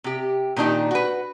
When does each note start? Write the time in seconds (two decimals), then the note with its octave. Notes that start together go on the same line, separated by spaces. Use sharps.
0.04 C3 G4
0.56 A#2 D#3 D4 D#4 G4
0.91 F#4 B4